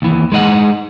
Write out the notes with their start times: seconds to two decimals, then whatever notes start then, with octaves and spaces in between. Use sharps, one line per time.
0.02 D#2 E3
0.32 G#3 D#4 D#5 F#5